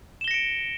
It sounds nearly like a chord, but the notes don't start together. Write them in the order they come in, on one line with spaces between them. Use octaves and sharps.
E7 G7 A#6 C#7 D7